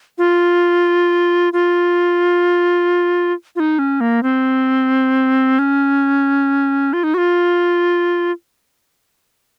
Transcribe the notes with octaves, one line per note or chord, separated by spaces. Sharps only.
F4
F4
F4
D#4
C#4
A#3
C4
C#4
F4
D#4
F#4
F4